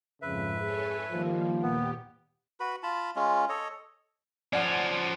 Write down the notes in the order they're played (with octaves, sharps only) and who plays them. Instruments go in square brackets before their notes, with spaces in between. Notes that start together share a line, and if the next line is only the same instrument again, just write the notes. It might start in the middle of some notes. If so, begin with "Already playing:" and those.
[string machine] F2 G#2 [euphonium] C#3 [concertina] B4 E5
[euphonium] G#4 [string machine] A4 C#5 G#5
[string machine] D#3 G3 A#3 [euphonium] F3
[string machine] D#2 A#2 G4 [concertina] B3
[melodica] F#4 B4 B5
F4 A5 B5
G#3 C#4 F4
A4 C#5 D#5
[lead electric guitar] F3 C#4 [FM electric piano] D5 F#5 C6